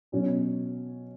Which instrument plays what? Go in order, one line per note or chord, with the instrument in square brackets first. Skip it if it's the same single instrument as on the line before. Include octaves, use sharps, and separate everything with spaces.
[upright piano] B2 F#3 C#4